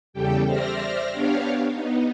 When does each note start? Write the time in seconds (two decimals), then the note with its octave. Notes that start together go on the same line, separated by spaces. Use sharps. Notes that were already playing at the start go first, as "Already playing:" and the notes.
0.13 E2 C#3 G3 G4 A4 G5
0.46 C5 D5 E5 F6 A#6
1.11 B3 D4 G4 C#5 F5
1.71 B3 D#4